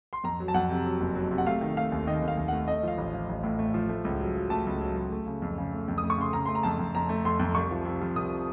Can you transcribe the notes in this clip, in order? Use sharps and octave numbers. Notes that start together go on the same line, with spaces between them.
C6
F2 A#5
F#3
A5
F2 F#5
C3
F#3
F#1
F#3
C3
F#5
A3 F5
D#3
A3 F5
D#2
D#3 D#5
D#2
F5
D#2
A3 F#5
A3 D#5
F3 F5
A1
F3
A1
A2
A3
F3
A3
C#2
F#3
F#3
A3 A5
C#2
F#3
C#2
A3
C#3
F2
C#3
A3
F2
D#6
A3
C#6
C#3 C6
C#3 A#5
A3 C6
A#5
F2 A5
F2
F2 A#5
A3
F2 C6
F2
C2 C#6
F3
C3
F3
C2 D#6